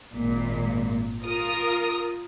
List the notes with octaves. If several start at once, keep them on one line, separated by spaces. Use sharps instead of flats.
G#1 A#2
F4 A#4 D#6